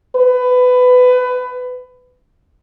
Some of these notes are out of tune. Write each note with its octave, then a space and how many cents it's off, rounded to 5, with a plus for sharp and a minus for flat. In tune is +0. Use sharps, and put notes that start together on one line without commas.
B4 +20